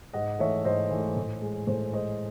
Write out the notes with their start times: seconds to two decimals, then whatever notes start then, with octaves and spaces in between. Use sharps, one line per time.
0.13 G#2 D#5 F#5
0.39 E3 A3 C#5 E5
0.65 G#2 C5 D#5
0.90 E3 A3
1.16 A2
1.42 G#3
1.67 A2 C5
1.93 G#3 C5 D#5